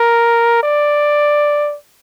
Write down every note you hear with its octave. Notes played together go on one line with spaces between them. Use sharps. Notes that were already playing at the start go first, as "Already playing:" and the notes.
Already playing: A#4
D5